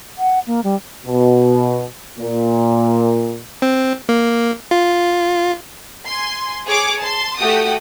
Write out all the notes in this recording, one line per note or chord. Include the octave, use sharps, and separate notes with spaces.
F#5
A#3
G3
B2
A#2
C4
A#3
F4
G#5 C6
G#4 C#5 D6
A5 C6
A3 F#4 G4 G5 D#6